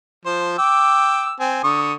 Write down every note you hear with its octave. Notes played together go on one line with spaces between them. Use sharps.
F3 C5
G5 D6 E6
C4 G#5
D3 C#6 D#6